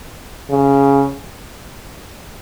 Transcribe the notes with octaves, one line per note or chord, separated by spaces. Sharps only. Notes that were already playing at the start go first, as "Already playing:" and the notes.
C#3